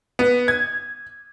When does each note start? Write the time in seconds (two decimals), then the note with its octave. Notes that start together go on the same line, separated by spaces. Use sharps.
0.19 B3
0.48 G#6